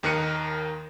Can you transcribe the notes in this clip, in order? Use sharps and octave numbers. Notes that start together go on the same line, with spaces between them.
D#2 D#3 A#4 F#6 C#7 D#7